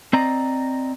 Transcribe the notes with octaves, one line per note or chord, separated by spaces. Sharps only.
C4 D5 D#5 A#5